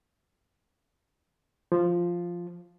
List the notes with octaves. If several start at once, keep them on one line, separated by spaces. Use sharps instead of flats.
F3